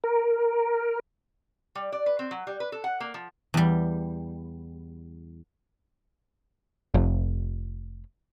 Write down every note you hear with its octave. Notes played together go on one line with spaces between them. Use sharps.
A#4
G3
D5
B4
C4
F#3
G3
B4
A4
F#5
A#3
F3
E2 G3
F1